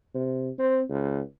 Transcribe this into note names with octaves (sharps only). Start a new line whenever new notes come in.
C3
C4
C#2